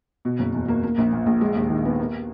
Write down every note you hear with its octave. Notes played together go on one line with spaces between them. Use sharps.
B2
F#1
E2
A#3
A#3
A#1
A#2
A#1
G#3
D#2
D#3
B3
A#3